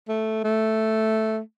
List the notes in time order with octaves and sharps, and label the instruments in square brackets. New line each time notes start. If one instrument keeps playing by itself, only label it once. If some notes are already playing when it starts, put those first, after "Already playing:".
[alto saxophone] A3
A3